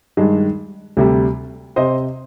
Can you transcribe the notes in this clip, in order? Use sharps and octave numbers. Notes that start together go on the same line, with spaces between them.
G2 D#3 G#3
D2 C3 G3
C3 C5 D#5